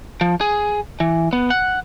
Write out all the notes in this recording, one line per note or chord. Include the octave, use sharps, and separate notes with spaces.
F3
G#4
E3
B3
F#5